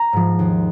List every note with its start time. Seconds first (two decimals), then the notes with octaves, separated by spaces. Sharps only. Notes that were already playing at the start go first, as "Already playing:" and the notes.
Already playing: A#5
0.13 G#2 F3
0.39 D#2